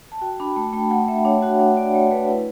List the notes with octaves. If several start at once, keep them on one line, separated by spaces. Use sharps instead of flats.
A5
F#4 G5
D4 B5
A3 A5
A3 G5
A3 F#5
A3 E5
D4 C#5
F#4 F#5
D4 F#5
F#4 D5
A3 C#5
A3 B4
E4